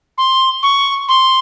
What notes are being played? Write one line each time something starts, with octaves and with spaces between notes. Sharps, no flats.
C6
C#6
C6